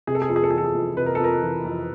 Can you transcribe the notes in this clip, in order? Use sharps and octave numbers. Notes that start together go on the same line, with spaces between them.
C3 G#4
A4
G#4
F2 A4
G#4
A4
E3 G#4
A4
G#4
F2
C3 B4
A#4
A4
F2 A#4
E3
F2